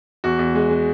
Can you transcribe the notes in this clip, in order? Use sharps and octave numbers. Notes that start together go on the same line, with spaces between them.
E2 F#4
E2
G#3
G#3